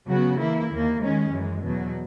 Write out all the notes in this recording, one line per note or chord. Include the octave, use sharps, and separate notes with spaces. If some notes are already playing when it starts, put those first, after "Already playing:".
C#3 F#3 B3 F#4
E3 A#3 E4
D#2 D#3 A#3
D#3 G#3 C#4
F#2 E3 G#3
E2 B2 F#3